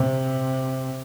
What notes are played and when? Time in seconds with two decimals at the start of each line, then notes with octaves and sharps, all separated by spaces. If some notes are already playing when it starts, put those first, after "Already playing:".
Already playing: C3